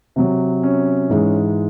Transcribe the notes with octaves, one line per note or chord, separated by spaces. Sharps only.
C3 F#3
C#4
G#2 E3 G#3